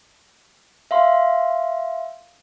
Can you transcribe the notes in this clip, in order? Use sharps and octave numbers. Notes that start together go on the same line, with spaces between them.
E5 F5 C6